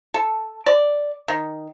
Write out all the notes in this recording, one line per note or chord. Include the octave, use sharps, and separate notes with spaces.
A4
D5
D#3